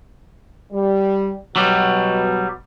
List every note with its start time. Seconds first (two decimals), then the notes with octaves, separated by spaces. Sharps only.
0.73 G3
1.56 B2 F#3 G3